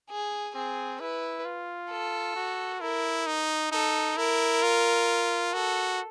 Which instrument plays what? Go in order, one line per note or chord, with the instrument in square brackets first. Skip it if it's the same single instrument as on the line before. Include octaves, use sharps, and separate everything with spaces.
[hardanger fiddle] G#4
[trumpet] C4 [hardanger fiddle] G#4
[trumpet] E4 [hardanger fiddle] B4
[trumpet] F4
[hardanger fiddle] A4
[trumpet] F#4
[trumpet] E4 [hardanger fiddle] A#4
[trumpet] D#4
[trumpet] D#4 [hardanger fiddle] A4
[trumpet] E4 [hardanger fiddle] A#4
[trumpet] F4
[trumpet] F#4 [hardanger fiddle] A4